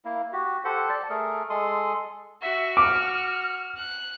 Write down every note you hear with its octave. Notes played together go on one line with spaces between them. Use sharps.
A#3 E4
F#4 G4
G4 A4 C5 F#5
D5 A5
A3 G#4 A#4
G#3 A4 C6 D#6
F#4 E5
D6 F6
F#6